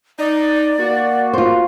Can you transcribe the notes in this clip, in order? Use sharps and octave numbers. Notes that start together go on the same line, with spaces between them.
D#4 D5
A#3 F#4
F4 C5